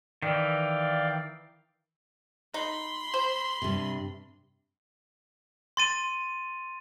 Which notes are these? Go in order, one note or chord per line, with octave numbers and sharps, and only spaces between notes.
D#3 E3 D5 F5 G5
D#4 B5 C6
C5
G2 C3
C6 A6 D#7